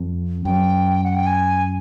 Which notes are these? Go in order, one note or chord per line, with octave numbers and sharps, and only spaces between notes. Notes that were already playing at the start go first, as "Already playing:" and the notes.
Already playing: F2
F#2 G5
F#5
G5
G#5